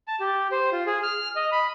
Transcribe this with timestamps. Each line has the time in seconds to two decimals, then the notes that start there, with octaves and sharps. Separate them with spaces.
0.08 A5
0.20 G4
0.52 C5
0.72 F4
0.87 G#4
1.03 F6
1.36 D#5
1.52 B5